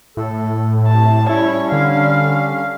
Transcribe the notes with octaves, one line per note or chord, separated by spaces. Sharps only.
A2 A4
C3 A5
G3 C#4 E4 C#5
D3 F5